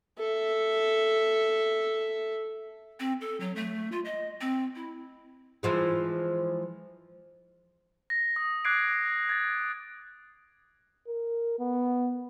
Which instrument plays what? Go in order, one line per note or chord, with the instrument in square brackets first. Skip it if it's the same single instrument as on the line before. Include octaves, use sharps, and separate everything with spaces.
[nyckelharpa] A4 E5
[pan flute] C4
A4
F#3
A3
F4
D#5
C4
E4
[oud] E3 F3 G#3
[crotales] A#6
D#6
D6 F#6 G#6 C7 D7
G#6 A6
[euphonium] A#4
B3